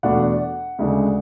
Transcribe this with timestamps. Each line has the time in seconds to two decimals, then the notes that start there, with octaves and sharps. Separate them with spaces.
0.03 E2 B2 A3 D4 F#5
0.79 D2 C#3 G#3 D4